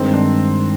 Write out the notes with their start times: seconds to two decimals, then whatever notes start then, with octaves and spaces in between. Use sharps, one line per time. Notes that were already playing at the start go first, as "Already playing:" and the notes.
Already playing: G2 D#3 G#3 C4 D#4
0.13 D4